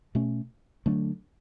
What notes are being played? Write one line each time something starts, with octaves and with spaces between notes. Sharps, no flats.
B2 A3 C#4
D3 F#3 A3 D4